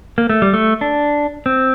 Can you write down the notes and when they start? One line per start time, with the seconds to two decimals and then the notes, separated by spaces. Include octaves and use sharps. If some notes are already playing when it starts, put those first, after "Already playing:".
0.18 A#3
0.30 A3
0.42 G3
0.53 A3
0.81 D4
1.46 C4